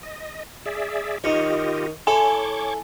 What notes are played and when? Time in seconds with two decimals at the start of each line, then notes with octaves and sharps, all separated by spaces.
0.03 D#5
0.66 G#4 D5 E5
1.24 D#3 F4 G4 C#5 D#5
2.07 E4 A4 C#5 G#5 C#6 D6